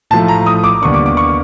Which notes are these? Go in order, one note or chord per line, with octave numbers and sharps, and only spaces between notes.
A2 F3 A3 A5
A#5
D#6
D6
D#2 D3 G3 B3 D4 C#6
D6
D6
C#6